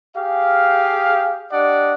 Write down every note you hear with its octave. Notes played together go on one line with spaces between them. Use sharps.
G4 G#4 F5
D4 G4 D5 D#5 F#5